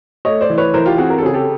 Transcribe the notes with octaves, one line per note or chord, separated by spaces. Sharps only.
A3 C#5 D#5
C5 D5
E3
B4 C#5
E3 A#4 C5
F4 G4
C4 F#4 G#4
A#4
A4
C#3 G#4
G4 A4